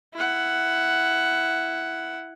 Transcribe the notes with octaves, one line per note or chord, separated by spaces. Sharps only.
E4 F#5